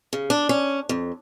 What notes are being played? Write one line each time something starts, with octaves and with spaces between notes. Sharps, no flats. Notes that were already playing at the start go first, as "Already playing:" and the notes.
C#3
D4
C#4
F2